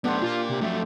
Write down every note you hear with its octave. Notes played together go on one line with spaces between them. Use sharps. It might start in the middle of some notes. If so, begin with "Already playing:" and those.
F#2 A3 B3 D4 G4 C5
A#2 A#3 F4
C3
F2 F#3 A3